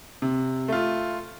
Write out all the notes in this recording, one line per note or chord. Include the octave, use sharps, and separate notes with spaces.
C3
A3 F4